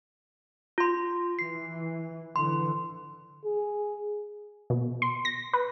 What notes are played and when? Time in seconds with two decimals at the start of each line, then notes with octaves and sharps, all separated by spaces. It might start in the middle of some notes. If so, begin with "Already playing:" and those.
0.78 F4 C6
1.39 E3 C7
2.36 D3 E3 C6
3.45 G#4
4.70 B2
5.02 C6
5.25 A#6
5.53 B4